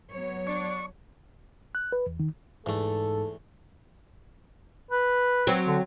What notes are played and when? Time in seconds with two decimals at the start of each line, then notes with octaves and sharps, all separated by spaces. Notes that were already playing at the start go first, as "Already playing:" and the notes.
0.12 F#3 B3 C#5
0.47 D4 C#6
1.75 F#6
1.92 B4
2.07 E2
2.20 D#3
2.66 E2 G#2 A3 A4
4.91 B4
5.47 F#3 C4
5.67 D3